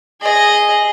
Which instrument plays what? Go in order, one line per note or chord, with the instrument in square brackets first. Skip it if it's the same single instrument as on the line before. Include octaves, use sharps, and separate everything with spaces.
[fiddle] G#4 D#5